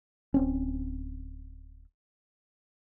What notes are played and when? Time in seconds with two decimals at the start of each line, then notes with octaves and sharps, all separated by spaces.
0.34 D1 C4 C#4